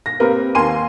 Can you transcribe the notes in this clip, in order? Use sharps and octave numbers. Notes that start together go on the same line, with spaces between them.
A#6
A#3 C4 G4 A#4 B4
D#2 A#4 G#5 C6 D#7